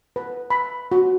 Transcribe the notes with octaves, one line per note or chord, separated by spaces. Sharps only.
B4
B5
F#4